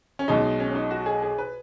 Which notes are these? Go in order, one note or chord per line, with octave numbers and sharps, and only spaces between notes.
C#4
B1 B2 G#3 D#4
C#4
C#4
D#4
F#4
G#4
G#4
B4